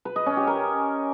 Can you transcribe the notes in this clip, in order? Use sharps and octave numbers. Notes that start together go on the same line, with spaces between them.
B4
D#5
C#4
G4
A#4